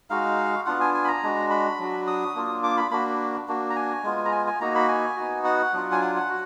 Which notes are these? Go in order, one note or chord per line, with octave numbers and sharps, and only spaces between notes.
G#3 D#4 F#4 F5
B3 D4 F4 F#5
G#5
G#5
B5
A#5
G#3 D4 F#4
B5
F#3 D4 F#4
D#6
A#3 D4 F4
D6
B5
A#3 D4 F#4 B5
A#3 D4 F#4
A#5
G#5
G#3 B3 F4
A#5
G#5
G#5
A#3 D#4 F#4 A#5
B5
G#5
B3 D#4 F#4
F#5
F#3 D4 F4
G#5
F#5
F#5
F#4